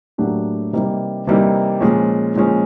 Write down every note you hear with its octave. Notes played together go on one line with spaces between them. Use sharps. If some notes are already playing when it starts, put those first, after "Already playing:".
A2 F#3 A#3 D4 G4
C3 E3 G3 A#3 D#4
C3 E3 G3 A#3 D#4
A#2 F3 G#3 C#4
A#2 F3 G#3 C#4